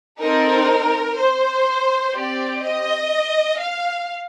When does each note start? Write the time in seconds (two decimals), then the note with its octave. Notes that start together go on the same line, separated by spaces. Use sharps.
0.20 C4 D#4 A4 A#4
1.17 C5
2.13 C4 G4 D5
2.62 D#5
3.59 F5